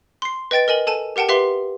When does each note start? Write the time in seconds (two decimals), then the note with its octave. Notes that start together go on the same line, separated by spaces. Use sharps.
0.22 C6 C7
0.51 B4 D#5 G5 A6 D7
0.68 A#4 D#5 G#5 F#7
0.87 A4 G#5 A5 D#7
1.16 G4 A#4 F#5 G5 A5
1.29 G4 B4 E5 F5 C6 G7